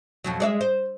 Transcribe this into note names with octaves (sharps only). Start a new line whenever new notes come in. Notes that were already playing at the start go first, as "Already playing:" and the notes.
F2 B2 F#3
G#3 D5 E5
C5